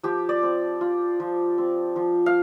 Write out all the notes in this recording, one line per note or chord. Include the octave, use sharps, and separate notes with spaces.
F3 G4
D5
C4
F4
F3
C4
F3
F5